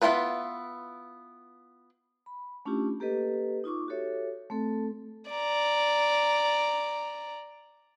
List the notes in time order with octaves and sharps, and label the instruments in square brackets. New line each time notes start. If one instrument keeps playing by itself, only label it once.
[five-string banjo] B3 E4 F4 A4 B4
[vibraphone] B5
A3 C#4 D4 E4 F4 G4
A#3 G4 A4 B4 D#5
D#4 F4 C#6 D6
F#4 G4 A4 C#5 E5
A3 C4 A4
[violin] D5 A#5